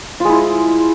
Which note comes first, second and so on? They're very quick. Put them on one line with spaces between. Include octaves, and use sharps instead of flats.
F4 G#3 E4